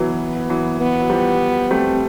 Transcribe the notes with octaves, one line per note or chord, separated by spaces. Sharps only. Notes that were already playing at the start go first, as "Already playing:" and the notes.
Already playing: E3 F#3 B3
E3 F#3
B3
F#3
F3 G3
G3 A3 C4